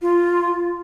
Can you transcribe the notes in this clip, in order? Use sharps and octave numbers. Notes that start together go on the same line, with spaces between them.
F4